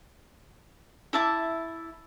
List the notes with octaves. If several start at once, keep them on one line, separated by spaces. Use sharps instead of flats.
E4 E5 A5 D6